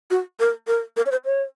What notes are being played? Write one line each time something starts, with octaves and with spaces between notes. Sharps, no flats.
F#4
A#4
A#4
A#4
C#5
C5
C#5